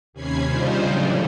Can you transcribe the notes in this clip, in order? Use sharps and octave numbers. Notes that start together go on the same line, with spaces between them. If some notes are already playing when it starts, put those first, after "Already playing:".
D#2 C3 C#4 B5 G#6 C7
C#3 G3 D4 D#4 F4 C5
A2 C#3 E3 F#3 G3